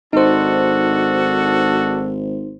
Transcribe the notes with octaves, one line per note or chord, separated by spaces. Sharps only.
G#1 D4 D#4 F#4 A4 C5